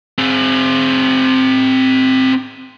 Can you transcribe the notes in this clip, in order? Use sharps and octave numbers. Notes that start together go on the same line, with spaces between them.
C4 G#4